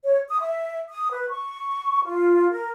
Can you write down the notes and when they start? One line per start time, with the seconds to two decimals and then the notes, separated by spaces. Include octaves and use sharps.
0.04 C#5
0.29 D#6
0.41 E5
0.90 D#6
1.10 B4
1.29 C#6
2.04 F4
2.51 A#4